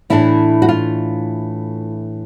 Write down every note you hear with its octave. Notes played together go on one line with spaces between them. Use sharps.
A2 E3 A3 D4 E4
F#4
F4